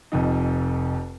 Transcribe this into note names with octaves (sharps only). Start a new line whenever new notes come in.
F1 F2 D#4